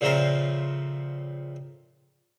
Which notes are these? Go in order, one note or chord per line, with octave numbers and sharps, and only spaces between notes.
A#2 C#3 F3 A3 C4 A#4